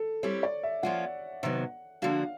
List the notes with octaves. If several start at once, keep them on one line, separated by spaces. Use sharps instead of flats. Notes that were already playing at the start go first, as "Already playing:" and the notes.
Already playing: A4
G3 C4 E4 G4 C#5
D5
E5
F3 A#3 C#4 F4 F#5
C3 D#3 F#3 B3
D3 F3 A#3 D4 F#4 F5